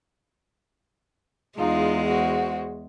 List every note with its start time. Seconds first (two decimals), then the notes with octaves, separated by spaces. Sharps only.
1.58 E2 G#3 D#4 F4
2.08 F#4 C5